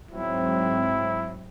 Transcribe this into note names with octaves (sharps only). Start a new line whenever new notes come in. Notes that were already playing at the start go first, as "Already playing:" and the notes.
G#2 F#3 C4 E4